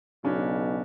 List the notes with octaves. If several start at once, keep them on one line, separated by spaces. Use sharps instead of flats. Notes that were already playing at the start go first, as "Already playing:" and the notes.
B1 C#3 C#4 D4